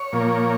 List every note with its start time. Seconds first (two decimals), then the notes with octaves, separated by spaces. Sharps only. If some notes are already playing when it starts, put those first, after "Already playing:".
Already playing: C#5
0.13 A#2 F3 A#3